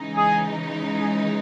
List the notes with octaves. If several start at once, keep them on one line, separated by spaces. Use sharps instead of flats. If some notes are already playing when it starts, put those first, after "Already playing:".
Already playing: C#3 E3 G#3 D#4
G#4
G#4